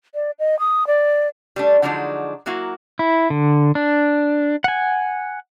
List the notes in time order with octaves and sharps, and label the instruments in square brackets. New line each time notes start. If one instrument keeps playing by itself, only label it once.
[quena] D5
D#5
D#6
D5
[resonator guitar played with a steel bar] G3 A3 D4
D3 F3 F#3 G#3 D4 D#4
F#3 A#3 E4 F#4
[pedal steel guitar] E4
D3
D4
F#5 G#5